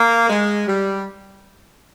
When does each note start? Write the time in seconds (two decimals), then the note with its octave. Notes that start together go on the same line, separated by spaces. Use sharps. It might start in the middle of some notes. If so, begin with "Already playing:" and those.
Already playing: A#3
0.30 G#3
0.68 G3